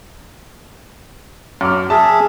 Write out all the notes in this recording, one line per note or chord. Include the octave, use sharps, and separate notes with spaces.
F#2 D6 F6
G#4 E5 A5